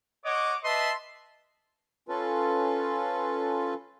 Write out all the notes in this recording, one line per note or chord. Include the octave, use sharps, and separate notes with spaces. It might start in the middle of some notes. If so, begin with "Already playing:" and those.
C#5 D#5 F#5 D6
B4 D#5 E5 A5 B5 C6
C#4 F4 A4 B4